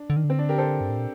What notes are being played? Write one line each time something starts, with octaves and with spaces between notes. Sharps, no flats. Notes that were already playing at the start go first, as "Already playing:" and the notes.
Already playing: D4
D3
D#3
D3
C4
D4
G4 A#4
A4 C5
G2
A2
A#2